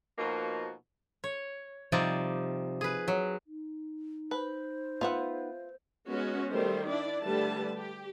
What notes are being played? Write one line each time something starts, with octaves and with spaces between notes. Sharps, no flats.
B2 F3 A#3 D#4 F#4
C#5
C3 F3 G3 D#4 D5
G#4 B4
F#3
D#4
B4 C5
B3 F4 E5 F#5
G#3 B3 C#4 F#4
D#3 G3 A3 C5
D4 E4 D5
D3 G3 A3 G4 B4 A5
G4